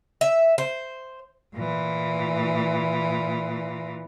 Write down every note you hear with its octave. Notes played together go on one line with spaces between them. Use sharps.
E5
C5
A#2 E3